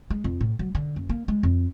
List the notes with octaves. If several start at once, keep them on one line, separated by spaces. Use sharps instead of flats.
G#3
F2
A2
F#3
D3
F#1
A#3
G#3
F2